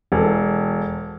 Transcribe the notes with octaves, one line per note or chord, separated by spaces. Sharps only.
E1 A4